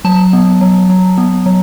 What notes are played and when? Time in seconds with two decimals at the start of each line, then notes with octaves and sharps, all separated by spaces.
0.05 F#3 A5
0.33 B3
0.61 F#3
0.90 F#3
1.18 B3
1.46 F#3